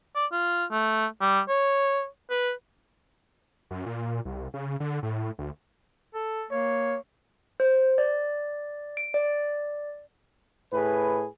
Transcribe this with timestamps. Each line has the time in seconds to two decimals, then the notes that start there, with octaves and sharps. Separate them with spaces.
0.15 D5
0.32 F4
0.71 A3
1.21 G3
1.49 C#5
2.31 B4
3.71 F#2
3.86 A#2
4.25 C2
4.54 C#3
4.80 D3
5.03 A2
5.39 D2
6.15 A4
6.51 A#3 C#5
7.60 C5
7.98 D5
8.97 D7
9.14 D5
10.73 A2 G#4 B4